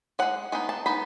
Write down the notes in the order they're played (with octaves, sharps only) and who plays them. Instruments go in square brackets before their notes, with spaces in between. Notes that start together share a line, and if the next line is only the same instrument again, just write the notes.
[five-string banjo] G#3 C#4 F#5
G#3 B3 D#4
A5
G#3 B3 D#4 B5